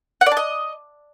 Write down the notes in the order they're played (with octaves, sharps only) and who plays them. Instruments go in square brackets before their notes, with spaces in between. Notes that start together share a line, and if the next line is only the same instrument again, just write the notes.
[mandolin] F#5
D5
A5
D#5